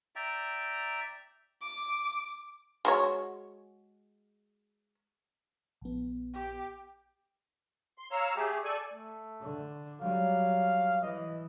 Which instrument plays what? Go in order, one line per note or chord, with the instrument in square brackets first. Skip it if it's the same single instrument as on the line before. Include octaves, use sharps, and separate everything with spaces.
[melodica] D5 E5 G5 A#5
[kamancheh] D6
[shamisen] G#3 F#4 C#5
[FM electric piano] A#1 B3
[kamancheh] G4
[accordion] C6
C#5 F5 A#5 E6
A3 G4 G#4
A4 D5 G#5
[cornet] A3
[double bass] D3
[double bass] F#3 G3 [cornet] F5
[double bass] E3 [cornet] D#5